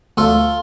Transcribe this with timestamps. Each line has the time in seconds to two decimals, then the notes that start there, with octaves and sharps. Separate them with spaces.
0.17 D2 F4 A4